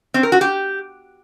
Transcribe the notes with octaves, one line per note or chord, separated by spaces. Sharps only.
C4
A#4
F#4
G4